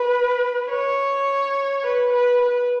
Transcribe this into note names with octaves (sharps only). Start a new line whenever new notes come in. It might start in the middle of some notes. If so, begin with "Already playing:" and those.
Already playing: B4
C#5
B4
B4
B4